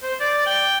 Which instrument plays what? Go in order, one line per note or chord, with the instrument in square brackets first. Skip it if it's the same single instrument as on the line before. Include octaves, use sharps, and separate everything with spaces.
[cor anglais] C5
D5
G5